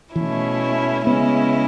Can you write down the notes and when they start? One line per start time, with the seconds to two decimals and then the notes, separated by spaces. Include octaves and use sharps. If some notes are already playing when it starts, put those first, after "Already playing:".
0.15 B2 E3 A3 C#4 E4
1.07 C#3 G#3 B3 C#4 E4